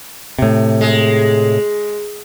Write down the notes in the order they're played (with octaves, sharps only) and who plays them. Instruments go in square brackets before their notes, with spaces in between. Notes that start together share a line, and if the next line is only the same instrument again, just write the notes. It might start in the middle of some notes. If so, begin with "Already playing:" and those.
[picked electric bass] A2 C3
[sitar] G#3